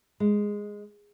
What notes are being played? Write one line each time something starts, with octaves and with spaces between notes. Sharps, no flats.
G#3